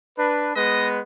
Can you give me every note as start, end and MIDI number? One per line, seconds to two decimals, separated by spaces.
0.17 0.51 62
0.17 0.51 71
0.56 1.01 56
0.56 1.01 59
0.56 1.01 71
0.56 0.86 75